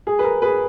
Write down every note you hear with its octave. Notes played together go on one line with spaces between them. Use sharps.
G#4
B4
A#4
G#4 B4